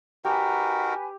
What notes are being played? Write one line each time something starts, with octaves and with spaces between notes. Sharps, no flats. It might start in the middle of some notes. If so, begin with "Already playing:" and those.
D#4 F#4 G4 A#4 B4 G#5